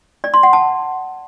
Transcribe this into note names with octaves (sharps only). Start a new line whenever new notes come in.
D5
C6
F#5
A5